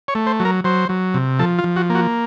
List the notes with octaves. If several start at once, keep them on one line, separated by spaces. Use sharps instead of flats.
C#5
A3
C5
F#3
A#4
F#3 C5
F#3
C3
F3 A4
F4
F3
F#4
A#3
F#4